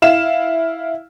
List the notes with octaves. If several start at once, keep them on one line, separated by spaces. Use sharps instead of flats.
E4 F5 E7